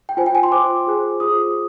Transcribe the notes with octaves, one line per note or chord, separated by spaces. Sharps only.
G5
F4 C5 G#5
G5
G#5
C6
F4 C5 D6
F4 G#4 C5
F4 G#4 C5 D#6